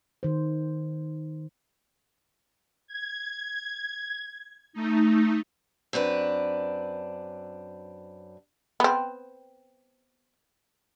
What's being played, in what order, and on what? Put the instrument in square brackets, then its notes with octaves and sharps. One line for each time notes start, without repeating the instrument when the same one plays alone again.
[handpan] D#3 C5
[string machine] G#6
A3 D#4
[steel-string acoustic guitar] F#2 C4 D4 B4
[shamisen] B3 C4